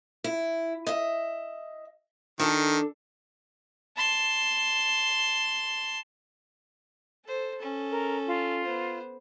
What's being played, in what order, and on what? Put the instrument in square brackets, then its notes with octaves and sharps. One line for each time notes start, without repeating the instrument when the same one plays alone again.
[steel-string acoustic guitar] E4
D#5 E5
[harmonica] D#3 [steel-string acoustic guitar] D4 A4
[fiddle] A5 C6
[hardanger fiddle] A4 C5
C#4 A4
[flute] A#4
F4
[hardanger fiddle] B3 C5